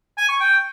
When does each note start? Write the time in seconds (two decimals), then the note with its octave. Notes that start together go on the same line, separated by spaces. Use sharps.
0.18 G#5
0.29 C#6
0.40 G5